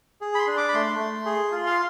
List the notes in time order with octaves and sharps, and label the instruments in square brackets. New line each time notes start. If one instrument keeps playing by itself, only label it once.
[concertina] G#4
B5
C6
D4
D6
B5
A3 C6
A3
G#4
F4
F5